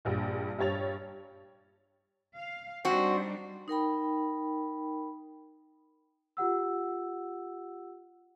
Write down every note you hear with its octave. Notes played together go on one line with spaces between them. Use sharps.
A#1 G2 A#2
G2 G4 C#5 A6 F7
F5
G3 C4 D4 D#4 F#4
D#4 A#4 G5 B5
F4 G4 F#5 E6